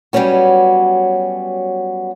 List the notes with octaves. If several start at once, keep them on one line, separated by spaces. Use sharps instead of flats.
F#3 G3 B3 C#4 F#4